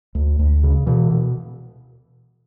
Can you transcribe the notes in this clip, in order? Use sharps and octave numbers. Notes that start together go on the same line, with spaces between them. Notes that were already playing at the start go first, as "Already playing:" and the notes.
D2
D2
C#3
B2 E3
B2